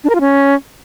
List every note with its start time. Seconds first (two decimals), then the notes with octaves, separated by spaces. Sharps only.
0.04 D4
0.10 A#4
0.15 F4
0.20 C#4